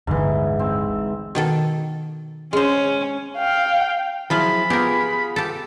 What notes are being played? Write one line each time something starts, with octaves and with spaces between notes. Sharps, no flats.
D1 G1 G#2 D3 E3
C4
B2 D#3 A4
G#3 C#4 C5
F5 G5
F3 F#3 E4 F4 G#4 F5 B5
B3 F4 G4 G#4 A#4
G4 A4